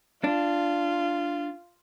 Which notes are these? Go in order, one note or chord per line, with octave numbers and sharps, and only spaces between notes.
D4 F4